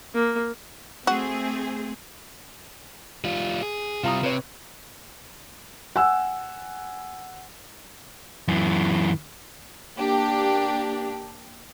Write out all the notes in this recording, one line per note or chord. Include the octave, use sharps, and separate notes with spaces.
A#3
A3 C4 F#4 G#4
G3 F4
G#4
C3 G3 F4 A#5 D#6
C3 B4 C#5
F#5 G#5 E6
F#2 E3
A#3 D4 G4